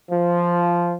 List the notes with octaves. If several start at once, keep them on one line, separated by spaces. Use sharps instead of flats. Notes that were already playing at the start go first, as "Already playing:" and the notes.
F3